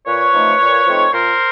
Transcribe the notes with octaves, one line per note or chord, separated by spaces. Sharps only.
A#2 B4 C#5
F3 A3 C4 D#4
A#2
F3 A3 C4 D#4
A#2 A#4 C5